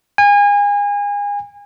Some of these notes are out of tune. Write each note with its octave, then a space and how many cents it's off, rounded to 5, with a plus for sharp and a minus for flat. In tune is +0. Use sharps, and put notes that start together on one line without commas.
G#5 -30